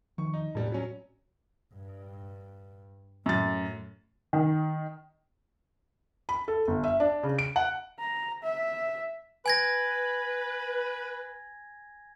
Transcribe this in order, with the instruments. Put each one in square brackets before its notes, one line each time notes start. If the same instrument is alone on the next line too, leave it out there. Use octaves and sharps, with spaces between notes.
[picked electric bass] D#3 F3 [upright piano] C#6
[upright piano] D#4
[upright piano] E1 G3 B3 [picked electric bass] A2
[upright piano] F#3 C#4
[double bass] G2
[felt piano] F#2 A6 [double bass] A2
[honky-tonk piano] D#3
[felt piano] B5
A4
G1
E5
D4
C#3
D7
F#5
[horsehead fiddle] A#5
E5
[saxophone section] B4 [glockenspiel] G#5 G#6 A#6